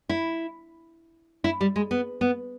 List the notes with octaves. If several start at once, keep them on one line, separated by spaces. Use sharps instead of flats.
E4
E4
G3
G#3
B3
B3